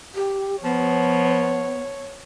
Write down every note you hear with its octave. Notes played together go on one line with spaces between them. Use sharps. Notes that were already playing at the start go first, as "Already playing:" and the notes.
G4
F3 B3 C#5